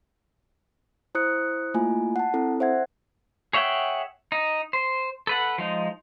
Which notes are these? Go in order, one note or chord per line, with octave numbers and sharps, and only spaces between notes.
E4 C5 D#6 F#6 C#7
A3 A#3 E4 F4 G#5
F#5 A5
C4 E4 A4
C5 E5 F#5 G#6
G#4 C#5 E5 F#5 G5
D#4
C5
A4 B4 F#5
F3 G#3 D#4